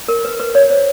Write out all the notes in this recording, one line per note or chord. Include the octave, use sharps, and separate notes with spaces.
A#4
B4
B4
C#5
C5